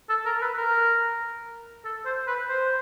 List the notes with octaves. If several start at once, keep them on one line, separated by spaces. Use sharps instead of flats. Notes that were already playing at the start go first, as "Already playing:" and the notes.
A4
A#4
B4
A#4
A4
C5
B4
C5